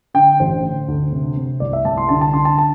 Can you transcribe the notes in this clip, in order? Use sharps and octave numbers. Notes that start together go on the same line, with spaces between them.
D3 G5
A1 C5
D3
D2
C3
C3
C2 D5
E5
C2 A5
C6
D3 A5
A5
D3 C6
A5
A5